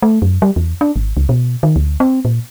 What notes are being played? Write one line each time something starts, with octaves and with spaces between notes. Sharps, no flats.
A3
F#2
G3
E2
D4
G#1
C#2
B2
D#3
D2
C4
A#2